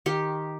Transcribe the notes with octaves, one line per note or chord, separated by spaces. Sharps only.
D#3 G4